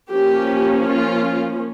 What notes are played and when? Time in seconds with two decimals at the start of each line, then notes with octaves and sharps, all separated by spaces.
0.11 F3 A#3 C#4 G4
0.87 F4